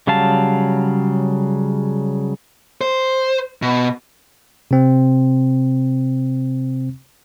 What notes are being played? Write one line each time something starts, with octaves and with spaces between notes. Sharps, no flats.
C#3 F#3 G3 F5 A5
C5
B2
C3 C4